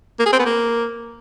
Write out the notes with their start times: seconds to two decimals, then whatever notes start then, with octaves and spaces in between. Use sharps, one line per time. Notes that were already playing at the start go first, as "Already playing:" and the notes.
0.19 A#3
0.26 G#4
0.33 C4
0.39 B3
0.46 A#3